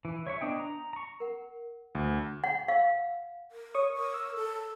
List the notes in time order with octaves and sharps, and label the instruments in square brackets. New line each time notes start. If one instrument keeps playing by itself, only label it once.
[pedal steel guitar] E3
C#5 E5 C#6
B3 D4 D#5 G5
A#5
A#5 C#6
[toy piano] A#4 F#5
[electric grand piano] D2
[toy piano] F#5
F5
[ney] A#4
[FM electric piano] C#5 C#6 D#6
[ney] A#4
[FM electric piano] E6
[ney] A4